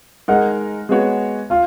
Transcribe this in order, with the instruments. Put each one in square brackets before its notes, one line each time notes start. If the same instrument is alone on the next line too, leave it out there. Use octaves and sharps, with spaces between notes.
[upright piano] G#3 D#4 A#4 [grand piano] F#5
[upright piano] G#3 B3 F#4 C#5
[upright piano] F4 [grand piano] F5